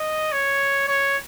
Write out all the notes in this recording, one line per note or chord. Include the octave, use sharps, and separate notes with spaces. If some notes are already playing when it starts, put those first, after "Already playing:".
Already playing: D#5
C#5
C#5